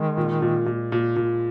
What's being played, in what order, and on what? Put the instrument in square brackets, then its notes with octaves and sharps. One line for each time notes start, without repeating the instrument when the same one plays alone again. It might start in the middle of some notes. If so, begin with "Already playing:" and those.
Already playing: [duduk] D#3 [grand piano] G#3
[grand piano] A#2
A#2
A#2
A#2
A#2